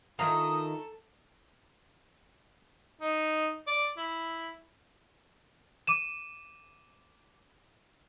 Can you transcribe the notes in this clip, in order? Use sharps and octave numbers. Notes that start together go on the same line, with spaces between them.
D#3 E4 F4 A4 A#5 D#6
D#4
D5
E4
D6 D#7 E7